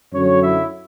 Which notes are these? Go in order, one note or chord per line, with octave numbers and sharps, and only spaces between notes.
F#2 D3 F#3 C#4 C#5
E4 E5